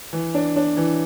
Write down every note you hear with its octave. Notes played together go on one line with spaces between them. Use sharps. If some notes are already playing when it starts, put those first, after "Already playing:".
E3
D4
D4
E3